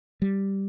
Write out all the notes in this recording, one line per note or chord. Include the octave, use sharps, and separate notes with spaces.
G3